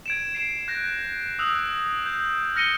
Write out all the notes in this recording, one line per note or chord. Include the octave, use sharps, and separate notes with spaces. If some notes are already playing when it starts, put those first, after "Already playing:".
G#6 D7 E7
C7 E7
F#6 G6 A#6
D#6 E6 F#6 F7
G6
F6 A#6 C#7 D#7 G7